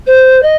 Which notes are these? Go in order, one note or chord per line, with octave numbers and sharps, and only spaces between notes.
C5
D#5